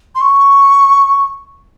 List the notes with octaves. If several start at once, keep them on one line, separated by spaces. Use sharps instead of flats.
C6
C#6